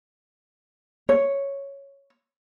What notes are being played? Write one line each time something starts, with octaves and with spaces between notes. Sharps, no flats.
C#5